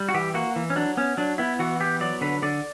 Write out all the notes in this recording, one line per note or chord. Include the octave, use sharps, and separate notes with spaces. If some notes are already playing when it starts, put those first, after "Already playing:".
Already playing: G3
F#4
E3 G4
A#3 F#4
E3
C#4
F#3 D4
B3 C#4
F#3 D4
B3 E4
E3 F#4
B3 G4
F#3 D5
D3 B4
D3 D5